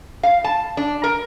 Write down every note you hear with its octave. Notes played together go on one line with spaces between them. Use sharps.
F5
A5
D4
A#4